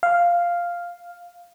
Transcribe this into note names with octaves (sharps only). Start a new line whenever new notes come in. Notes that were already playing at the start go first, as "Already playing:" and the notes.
F5